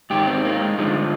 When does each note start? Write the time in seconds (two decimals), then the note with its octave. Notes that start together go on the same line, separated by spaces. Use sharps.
0.10 G#2 D#3 G4
0.27 C4
0.45 A#3
0.62 G#3
0.78 G2 D3 F3 G#3